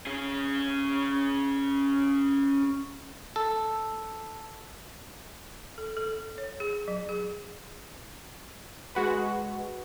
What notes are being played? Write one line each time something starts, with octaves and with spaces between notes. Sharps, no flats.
C#4 G#4
A4
A4
A4
C#5
G#4
F#3
G#4
G#3 F#4 B4